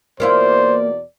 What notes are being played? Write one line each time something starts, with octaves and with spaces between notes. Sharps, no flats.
E2 B2 A#3 E4 F4 C5 D5